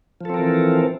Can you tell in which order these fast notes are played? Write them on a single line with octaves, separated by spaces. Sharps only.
F3 A4 C4 A#4 E3